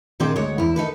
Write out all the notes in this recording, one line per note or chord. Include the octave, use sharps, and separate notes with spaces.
A#2 D#3 C4 D4 G#4 D5
D2 G#3 C#5 F#5
E2 E4
D#3 D#4 A4 B4